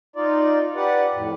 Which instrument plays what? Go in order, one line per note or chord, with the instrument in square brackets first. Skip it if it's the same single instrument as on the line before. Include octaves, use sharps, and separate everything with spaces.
[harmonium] D#4 F4 D5
G4 B4 D5 F#5
F2 A2